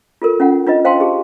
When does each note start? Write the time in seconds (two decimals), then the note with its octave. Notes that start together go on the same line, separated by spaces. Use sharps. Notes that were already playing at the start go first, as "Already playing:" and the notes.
0.22 F4 A4 A#4
0.40 C#4 F4 F#5
0.67 D4 F4 B4 D#5
0.85 C5 F5 G5 A5 C6
1.00 G4 G#4